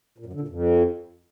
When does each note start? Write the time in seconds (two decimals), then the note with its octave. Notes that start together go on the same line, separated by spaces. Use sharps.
0.18 A#2
0.26 F#2
0.33 D3
0.41 A#2
0.48 F2